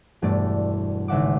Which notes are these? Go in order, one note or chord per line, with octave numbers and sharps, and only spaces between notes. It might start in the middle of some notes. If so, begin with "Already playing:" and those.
E1 G2 A3 D5
G#1 C#3 E5 F#5 D6